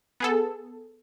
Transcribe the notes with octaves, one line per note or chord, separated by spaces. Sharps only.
B3 G#4 A4